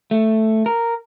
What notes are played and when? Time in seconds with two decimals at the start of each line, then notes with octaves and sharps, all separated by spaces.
0.11 A3
0.66 A#4